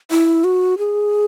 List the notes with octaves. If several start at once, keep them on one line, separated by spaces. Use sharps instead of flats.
E4
F#4
G#4